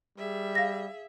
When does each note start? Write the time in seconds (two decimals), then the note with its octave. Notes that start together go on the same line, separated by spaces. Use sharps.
0.18 G3 G#4 E5
0.55 F5 A#6